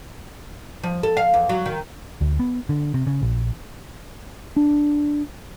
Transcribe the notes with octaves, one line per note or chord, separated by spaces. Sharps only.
F3
A4
F5
E2
F#3
D#3
D2
B3
D3
C3
C#3
A#1
D4